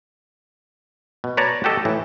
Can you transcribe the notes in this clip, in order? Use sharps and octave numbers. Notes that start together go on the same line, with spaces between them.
B2
B4 C#5 D5 A5 A#5
F#4 G4 A4 D#5
A2 E3